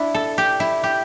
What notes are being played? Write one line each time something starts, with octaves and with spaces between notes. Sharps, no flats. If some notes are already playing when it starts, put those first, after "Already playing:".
Already playing: D4 E4
A4
G4
E4
G4